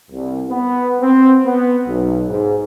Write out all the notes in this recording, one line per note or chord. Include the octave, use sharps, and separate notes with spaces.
C2
B3
C4
B3
B1
G#2